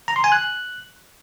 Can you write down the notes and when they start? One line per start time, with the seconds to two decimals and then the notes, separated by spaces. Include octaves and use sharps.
0.08 A#5
0.16 C6
0.24 G#5
0.32 F#6